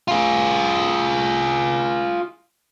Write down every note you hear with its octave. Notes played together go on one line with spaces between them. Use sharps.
F4 G#4